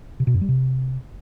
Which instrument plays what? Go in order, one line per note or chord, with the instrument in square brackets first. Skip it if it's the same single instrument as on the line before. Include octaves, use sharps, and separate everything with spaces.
[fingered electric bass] C3
B2
F#2
G3
C3